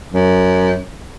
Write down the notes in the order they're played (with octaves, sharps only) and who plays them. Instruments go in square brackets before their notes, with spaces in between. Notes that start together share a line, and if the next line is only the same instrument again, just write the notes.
[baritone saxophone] F#2